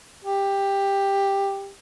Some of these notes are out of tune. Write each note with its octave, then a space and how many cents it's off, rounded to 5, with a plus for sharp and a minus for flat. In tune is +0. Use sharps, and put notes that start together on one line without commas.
G4 +10